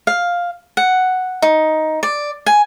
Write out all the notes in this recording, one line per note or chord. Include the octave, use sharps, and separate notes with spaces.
F5
F#5
D#4
D5
G#5